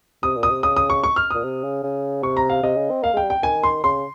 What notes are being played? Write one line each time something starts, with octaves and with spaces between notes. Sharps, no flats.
C3 D#6
A#2
D#6
C3
C#3 D#6
D#6
C#6
C#6
F6
A#2 D#6
C3
C#3
C#3
C3 C#6
A#5
F5
C3 D#5
C#3
C4
A#3 F5
G#3 G5
G3
G5
D#3 G#5
C6
C#3 C6